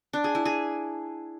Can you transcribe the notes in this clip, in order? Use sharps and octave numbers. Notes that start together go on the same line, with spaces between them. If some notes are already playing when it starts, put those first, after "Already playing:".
D4
G#4
E4
G#4